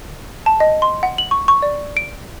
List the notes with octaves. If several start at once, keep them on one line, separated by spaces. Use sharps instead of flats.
A5
D#5
C6
F#5
F#7
C#6
C#6
D5
D7